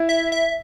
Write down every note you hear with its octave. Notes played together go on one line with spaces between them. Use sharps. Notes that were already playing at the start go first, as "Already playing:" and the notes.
Already playing: E4
E5
E5